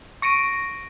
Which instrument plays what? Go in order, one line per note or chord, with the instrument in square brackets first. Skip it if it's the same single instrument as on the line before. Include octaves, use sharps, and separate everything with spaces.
[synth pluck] C#6 A#6 D7 D#7